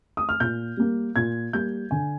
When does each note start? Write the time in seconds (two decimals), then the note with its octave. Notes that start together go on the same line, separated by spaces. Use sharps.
0.17 D#6
0.29 F6
0.40 A#2 G6
0.77 G3 A#3
1.16 A#2 G#6
1.53 G3 A#3 G6
1.91 D3 G#5